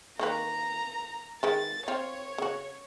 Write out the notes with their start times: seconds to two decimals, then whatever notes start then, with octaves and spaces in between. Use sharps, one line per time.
0.19 D#3 A#3 B4 A#5
1.43 D#3 G#3 B4 A6
1.88 C4 F4 C#5
2.38 C#3 F#4